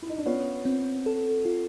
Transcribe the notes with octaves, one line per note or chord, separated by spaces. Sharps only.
E4
D#4
D4
B3 C#4 F4
C4
A4
F4